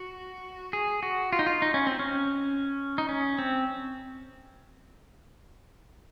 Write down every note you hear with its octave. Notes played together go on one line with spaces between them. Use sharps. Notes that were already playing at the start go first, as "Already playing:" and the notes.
Already playing: F#4
G#4
F#4
F4
D#4
F4
D#4
C#4
C4
C#4
D#4
C#4
C4